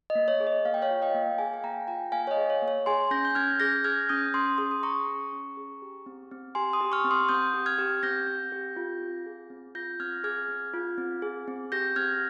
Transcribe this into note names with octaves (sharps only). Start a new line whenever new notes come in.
D#5
A#3
C#5
G#4
D#5
A#3 F5
G5
C#5 F5
F4
D#5 G5
A#3
G#4 F5 G#5
G#5
A#3 G5 A#5
F4 G5 A#5
A#3 F5 G#5
C#5
D#5
G#4
C#5
A#3
C#5
G#4 G#5 C6
C#4 G6 A#6
G6
C#4 F6 G#6
G#4 G6 A#6
G#4 F6 G#6
C#4 D#6 G6
C#4 C6 D#6
G#4 C6 D#6
D#6
G#4 A#5 C#6
C#4
C#4
G#4
G4
C4
C4
G4 G#5 C6
C6 D#6
G4
C#6 F6
C4
C6 D#6
C4 D#6 G6
G4
F6 G#6
G4
C4 G6 A#6
C4
G4
F4
C4
G#4
C4
F4 G6 A#6
C4 F6 G#6
G#4 F6 G#6
C4
F4
C4
G#4
C4
G4 G6 A#6
C4 F6 G#6